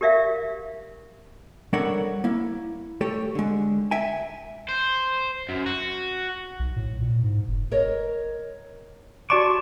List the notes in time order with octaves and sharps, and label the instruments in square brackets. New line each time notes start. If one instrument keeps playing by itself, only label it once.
[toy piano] G4 A#4 D5 E5 F5
[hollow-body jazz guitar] G3 D4 A4 A#4 C#5 F#5
A#3 E4
A3 G4 A4 C#5
D3 G#3
E5 G5 G#5
[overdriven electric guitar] C5
F#2
F#4
[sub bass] B1
A2
A#2
G#2
F#1
[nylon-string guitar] A#4 C#5 D#5
[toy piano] F#4 D5 B5 [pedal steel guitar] A5 C#6 D6